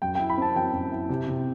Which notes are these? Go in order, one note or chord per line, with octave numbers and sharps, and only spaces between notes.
F#2 G5
E4 G5
B5
C4 A5
F#3 G5
F#2
E4
C3
C3